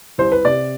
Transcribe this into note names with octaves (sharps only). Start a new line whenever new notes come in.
C2 C5
B4
C3 D5